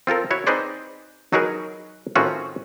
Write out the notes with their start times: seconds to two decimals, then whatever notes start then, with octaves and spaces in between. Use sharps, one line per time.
0.07 C4 F4 A4 A#4
0.31 E4 F#4 C#5
0.47 C4 D#4 G#4 B4 C5 D5
1.33 F#3 D#4 F#4 G#4 A#4 B4
2.16 A2 D#3 C4 C#4 F4 F#4